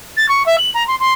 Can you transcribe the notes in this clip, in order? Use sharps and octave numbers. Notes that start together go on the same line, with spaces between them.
A6
C#6
E5
F#7
A#5
C6
C6